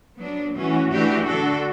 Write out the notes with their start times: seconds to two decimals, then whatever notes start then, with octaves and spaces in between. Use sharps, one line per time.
0.19 F#3 B3 D4
0.55 E3 A3 C#4 F#4
0.90 E3 A3 D4 G4
1.27 D3 A3 D4 A4